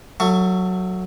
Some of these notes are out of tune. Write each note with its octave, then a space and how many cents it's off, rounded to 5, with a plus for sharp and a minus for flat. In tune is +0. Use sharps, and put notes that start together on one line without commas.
F#3 +0 A3 +20 C#6 +0